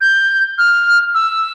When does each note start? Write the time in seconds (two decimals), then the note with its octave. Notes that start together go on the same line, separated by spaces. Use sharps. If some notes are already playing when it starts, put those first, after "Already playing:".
0.01 G6
0.58 F6
1.15 E6